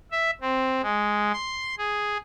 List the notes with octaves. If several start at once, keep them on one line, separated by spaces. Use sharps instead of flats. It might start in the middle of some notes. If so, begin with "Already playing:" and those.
E5
C4
G#3
C6
G#4